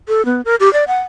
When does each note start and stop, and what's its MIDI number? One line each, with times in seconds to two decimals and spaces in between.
0.08 0.25 69
0.25 0.41 59
0.45 0.56 70
0.60 0.71 67
0.73 0.84 74
0.88 1.01 78